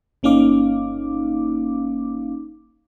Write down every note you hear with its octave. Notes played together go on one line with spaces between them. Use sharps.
G1 A#3 C#4 D#4 F5 D6